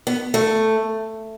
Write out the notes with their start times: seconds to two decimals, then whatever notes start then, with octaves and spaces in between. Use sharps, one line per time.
0.07 B3
0.34 A3